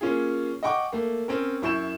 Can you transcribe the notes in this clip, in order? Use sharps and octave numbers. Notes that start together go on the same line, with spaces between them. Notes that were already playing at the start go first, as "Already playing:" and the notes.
A#3 C#4 F4 G#4
D#5 F#5 G5 C#6 D6
A3 A#3
C4 C#4 A#4
F#2 E4 C#6 G6 E7